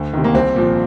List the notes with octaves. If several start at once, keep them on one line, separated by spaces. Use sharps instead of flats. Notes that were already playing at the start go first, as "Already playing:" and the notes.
Already playing: D2
C3 D#3
A#3
C2 C4
A#2 F3